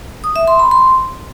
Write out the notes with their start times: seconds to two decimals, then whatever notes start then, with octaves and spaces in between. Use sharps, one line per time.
0.24 D#6
0.36 E5
0.48 C6
0.59 B5
0.71 C6